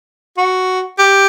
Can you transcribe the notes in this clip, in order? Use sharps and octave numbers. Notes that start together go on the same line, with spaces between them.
F#4
G4